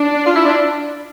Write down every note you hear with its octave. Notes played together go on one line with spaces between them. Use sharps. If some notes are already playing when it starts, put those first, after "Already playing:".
Already playing: D4
F4
E4
D4